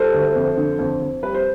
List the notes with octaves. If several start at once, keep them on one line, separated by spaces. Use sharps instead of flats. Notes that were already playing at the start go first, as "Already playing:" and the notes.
Already playing: G3 A4 C5
D2
F2
D3
F2
F2
G3 B4
C5